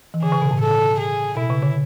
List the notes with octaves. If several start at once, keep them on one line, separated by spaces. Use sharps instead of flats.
E3
D3 G#4
C#3
B2
A2
A4
G#4
B2 E4
C#3
D3